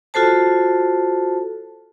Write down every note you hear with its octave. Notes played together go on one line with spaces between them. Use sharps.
F4 F#4 A4 C5 A5